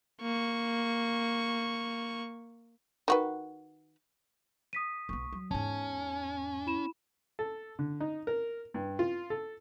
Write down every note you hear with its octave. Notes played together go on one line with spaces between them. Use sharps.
A#3 C#6
D#3 F#4 B4
D#6 B6 D#7
B1 B3 C#6
F#3
E2 G#2 C#4 G#5 A5
E4 B5 E7
A4
D3
D#4
A#4
G2
F4
A4